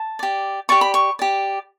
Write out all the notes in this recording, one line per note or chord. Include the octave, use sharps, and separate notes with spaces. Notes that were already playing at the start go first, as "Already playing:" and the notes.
Already playing: A5
G4 D5
G4 D5 C#6
B5
C#6
G4 D5